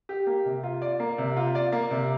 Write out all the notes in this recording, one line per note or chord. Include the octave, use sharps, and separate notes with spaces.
G4
A#3
C3
F4
D5
A#3
C3
F4
D5
A#3
C3